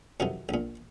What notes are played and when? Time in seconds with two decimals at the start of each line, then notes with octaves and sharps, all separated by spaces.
0.20 F2 C3 D#3 F#3
0.49 A#1 A#2